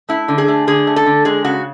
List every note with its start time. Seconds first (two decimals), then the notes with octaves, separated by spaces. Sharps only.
0.09 A3 E4
0.28 D3
0.38 G#4
0.48 A3
0.67 D3 G#4
0.87 A3
0.96 A4
1.06 D3
1.25 G#3 G#4
1.44 C#3 F#4